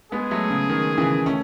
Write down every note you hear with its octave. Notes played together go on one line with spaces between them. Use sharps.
G#3 B3 G#4
F#3 A3
C#3
D#3
C#3 E3
A3 C#4